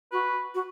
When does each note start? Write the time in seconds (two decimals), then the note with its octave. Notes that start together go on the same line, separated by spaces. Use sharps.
0.12 F#4 B4
0.55 F#4